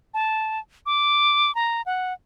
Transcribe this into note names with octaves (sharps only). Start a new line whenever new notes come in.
A5
D6
A#5
F#5